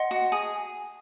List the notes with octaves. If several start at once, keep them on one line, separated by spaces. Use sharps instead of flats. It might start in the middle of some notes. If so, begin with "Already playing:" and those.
Already playing: D#5 F#5 C6
F#4
G#4